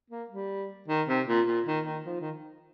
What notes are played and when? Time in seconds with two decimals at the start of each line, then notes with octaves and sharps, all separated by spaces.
0.10 A#3
0.30 G3
0.88 D#3
1.08 C3
1.27 A#2
1.47 A#2
1.66 D#3
1.85 D#3
2.06 F3
2.20 D#3